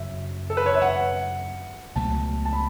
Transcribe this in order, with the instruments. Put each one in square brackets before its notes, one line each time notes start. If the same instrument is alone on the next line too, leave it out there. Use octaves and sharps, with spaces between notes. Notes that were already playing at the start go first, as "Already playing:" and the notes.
Already playing: [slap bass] F#2 C#3 F#3 [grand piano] E5
[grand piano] A4
B4
C#5
E5
F#5
[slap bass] C#2 B2 F#3 A3 [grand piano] A5
[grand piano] A5
B5